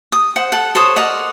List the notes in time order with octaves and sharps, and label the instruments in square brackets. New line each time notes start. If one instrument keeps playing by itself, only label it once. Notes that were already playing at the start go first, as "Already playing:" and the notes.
[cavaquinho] D#6
C5 F#5
A4 F#5
A4 C5 C#5 D#6
A#4 D5 D#5 F#5